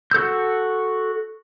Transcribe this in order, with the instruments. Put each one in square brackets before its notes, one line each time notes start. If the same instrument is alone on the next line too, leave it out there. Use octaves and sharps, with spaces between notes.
[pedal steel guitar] F#4 A4 E6 G6